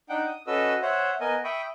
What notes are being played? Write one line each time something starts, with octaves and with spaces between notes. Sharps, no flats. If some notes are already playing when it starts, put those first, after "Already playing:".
D4 D#4 F#5 G5
D#6
C#4 F#4 A4 B4 D#5 E6
C5 C#5 E5 F#5
B3 A#4 D#5 G#5
E5 G5 B5 C#6 D#6